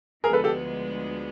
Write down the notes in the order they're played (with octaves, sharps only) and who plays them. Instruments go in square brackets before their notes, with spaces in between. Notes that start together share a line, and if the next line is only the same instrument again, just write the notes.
[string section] D2 D3 F3 G#3 B3 [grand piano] G#4 A#4
[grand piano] A4 B4
G4 A4